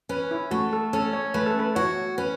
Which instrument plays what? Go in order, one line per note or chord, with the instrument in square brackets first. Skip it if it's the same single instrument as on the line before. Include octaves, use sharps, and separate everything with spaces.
[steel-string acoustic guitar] C#4 [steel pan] B4
[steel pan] E4
[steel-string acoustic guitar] A3 [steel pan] F#4
[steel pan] A4
[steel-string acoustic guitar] C#4 [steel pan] A4
[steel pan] C#5
[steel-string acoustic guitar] A3 [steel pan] B4
[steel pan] A4
B4
[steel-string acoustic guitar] F#4 [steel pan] C#5
[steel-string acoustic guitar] C#4 [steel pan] B4